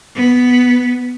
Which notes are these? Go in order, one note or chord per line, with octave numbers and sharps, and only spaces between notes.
B3